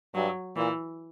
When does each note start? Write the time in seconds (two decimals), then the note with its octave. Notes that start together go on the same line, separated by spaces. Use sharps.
0.15 G2 F#3
0.56 A#2 E3